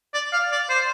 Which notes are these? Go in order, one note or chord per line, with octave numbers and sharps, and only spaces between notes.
D5
F5
D5
C5